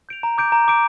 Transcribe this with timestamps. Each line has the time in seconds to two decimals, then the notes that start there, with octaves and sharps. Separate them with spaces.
0.09 G6 D7 F7
0.23 A#5
0.38 D6 G6 D7
0.52 A#5
0.68 D6 G6 D7